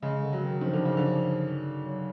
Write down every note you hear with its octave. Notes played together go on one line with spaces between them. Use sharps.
C#3 G#3
D3
F#3
D#3
D#3 F3
D3
C#3
D3
F#3